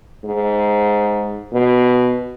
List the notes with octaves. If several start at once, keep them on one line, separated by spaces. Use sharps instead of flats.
G#2
B2